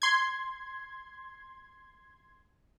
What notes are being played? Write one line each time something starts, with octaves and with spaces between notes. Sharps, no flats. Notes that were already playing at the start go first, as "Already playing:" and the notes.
C6 G#6